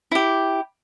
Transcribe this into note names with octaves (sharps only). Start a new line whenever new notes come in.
E4 G4